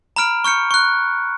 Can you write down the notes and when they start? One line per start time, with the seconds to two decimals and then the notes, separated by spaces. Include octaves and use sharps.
0.16 A#5 B5 F6 D7
0.44 C#6 F6 G6 C#7
0.71 C#6 F#6